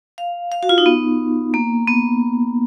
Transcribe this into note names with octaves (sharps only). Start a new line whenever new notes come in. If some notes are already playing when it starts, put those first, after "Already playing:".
F5
F5
F#4
F4
D#4
B3
A#3
B3